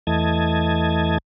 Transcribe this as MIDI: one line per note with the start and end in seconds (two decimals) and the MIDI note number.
0.07 1.18 40
0.07 1.18 52
0.07 1.18 57
0.07 1.18 75
0.07 1.18 81
0.07 1.18 92